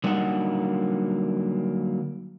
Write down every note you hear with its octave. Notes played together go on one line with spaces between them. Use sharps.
D3 F#3 G3 A#3 D#4 F#5